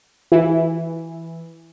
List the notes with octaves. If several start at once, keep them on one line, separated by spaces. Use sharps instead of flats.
E3